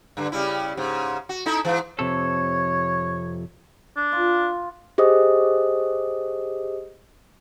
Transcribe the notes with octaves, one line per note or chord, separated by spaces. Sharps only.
G2 D3
C#3 G3 E4
G#2 C#3
F#4
D#4 E4 A4
G#2 E3
F2 C3 A4 C#5
D4
F4
G4 G#4 C5 D#5 D#6